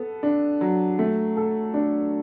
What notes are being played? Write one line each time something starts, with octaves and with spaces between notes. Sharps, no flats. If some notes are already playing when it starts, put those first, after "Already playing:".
Already playing: B3 A4
D4
F#3
A3
A4
D4